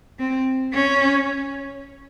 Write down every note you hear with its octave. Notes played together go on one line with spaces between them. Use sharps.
C4
C#4